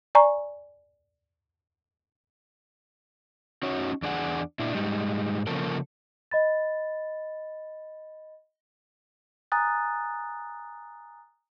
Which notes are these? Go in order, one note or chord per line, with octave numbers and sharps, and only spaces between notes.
D5 G#5 A#5 C#6
C#4 D#4 F#4 C#5
E2 D4 G#4 F#5
A#2 D4 E4
G#2 G3 G#3 D#4
C#3 F3 A#3 C#4 A4 A#4
D#5 B5 A6
G#5 A#5 D#6 F#6 A6